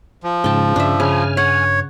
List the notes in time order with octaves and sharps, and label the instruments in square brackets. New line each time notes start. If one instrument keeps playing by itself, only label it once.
[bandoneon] F3
[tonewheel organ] G#2 C#3 [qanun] G5 A5
[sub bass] G2 [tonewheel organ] C#3 [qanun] D4 E5
[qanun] C#3 [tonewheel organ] G#5 F6
[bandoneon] C#5 [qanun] F#5